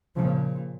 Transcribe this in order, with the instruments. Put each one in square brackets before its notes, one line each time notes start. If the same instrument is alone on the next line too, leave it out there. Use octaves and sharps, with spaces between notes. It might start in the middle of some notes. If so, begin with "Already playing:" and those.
[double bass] A#2 [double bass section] C#3 F3